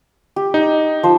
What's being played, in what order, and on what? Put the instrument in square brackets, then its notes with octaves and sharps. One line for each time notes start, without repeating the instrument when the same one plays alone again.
[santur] G4
[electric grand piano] D#4
[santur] F3 C5